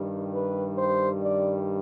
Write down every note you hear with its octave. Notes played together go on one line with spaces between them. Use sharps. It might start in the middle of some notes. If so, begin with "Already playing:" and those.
Already playing: G2 D#3 G3
B4
C5
D5